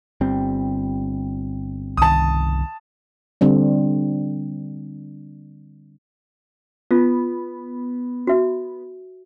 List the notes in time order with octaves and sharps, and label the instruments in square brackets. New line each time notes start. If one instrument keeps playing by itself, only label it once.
[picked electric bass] G1 G3 C4
[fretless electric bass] C2 D#3 [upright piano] A5 D#6
[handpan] D3 G3 C4 D4
[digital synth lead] B3 [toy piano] F4
[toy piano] F#4 E5